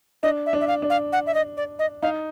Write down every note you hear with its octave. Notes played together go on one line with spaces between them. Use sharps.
D4 D#5
E5
D4
E5
F5
D4
F5
F#5
E5
D#5
D5
D#5
D#4 F5